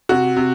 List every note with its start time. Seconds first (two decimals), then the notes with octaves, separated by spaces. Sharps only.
0.09 C3 F#4
0.36 C3